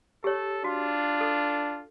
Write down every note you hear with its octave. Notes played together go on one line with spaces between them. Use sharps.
G4 A4 C#5
D4 F4 F#4
A4